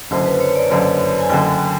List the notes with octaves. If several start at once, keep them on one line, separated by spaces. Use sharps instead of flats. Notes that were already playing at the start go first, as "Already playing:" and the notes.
F#1 F#2 D3 C5
B4
C#5
D5
F#1 F#2 D3
G#5
F#1 F#2 D3 G5